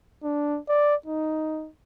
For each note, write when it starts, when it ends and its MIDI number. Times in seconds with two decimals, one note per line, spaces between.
0.23 0.59 62
0.69 0.95 74
1.06 1.69 63